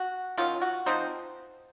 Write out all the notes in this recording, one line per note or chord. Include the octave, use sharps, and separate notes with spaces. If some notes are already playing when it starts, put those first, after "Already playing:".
Already playing: F#4
D#3 F#3 C#4 F4
F#4
F3 C4 D#4 C5